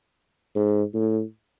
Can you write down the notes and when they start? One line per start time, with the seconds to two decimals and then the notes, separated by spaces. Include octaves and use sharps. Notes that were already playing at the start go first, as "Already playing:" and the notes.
0.56 G#2
0.94 A2